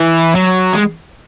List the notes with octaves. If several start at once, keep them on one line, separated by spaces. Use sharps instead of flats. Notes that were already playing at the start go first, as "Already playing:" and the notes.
Already playing: E3
F#3
G#3